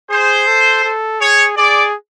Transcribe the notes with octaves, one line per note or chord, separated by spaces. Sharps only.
G#4 C5
A4
A4
G#4 C#5
G#4 D5